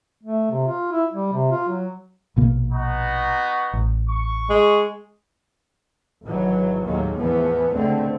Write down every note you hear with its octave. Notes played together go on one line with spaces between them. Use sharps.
A3
C3
F4
E4
G3
C3
F4
F#3
A#1 B2 A#3
B3 D#4 F#4
A1
C#6
G#3
G#1 E3 F#3
D#2 A2 D#3 F#3 G#3 A#3
E2 E3 F3 B3
C#2 D3 A3 C4